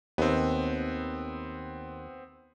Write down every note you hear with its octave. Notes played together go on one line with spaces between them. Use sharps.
D#2 B3 C4